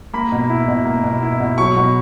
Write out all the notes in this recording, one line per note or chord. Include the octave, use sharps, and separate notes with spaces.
A#3 B5
B2
E4
B2
A#3
B2
E4
B2
F#3 C#6
B2